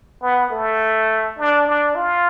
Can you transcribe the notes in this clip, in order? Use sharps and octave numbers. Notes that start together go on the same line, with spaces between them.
B3
A3
D4
D4
F4